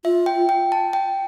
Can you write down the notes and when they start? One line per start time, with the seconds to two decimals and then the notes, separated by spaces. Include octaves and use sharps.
0.05 F4 E5
0.26 G5
0.49 G5
0.72 A5
0.93 G5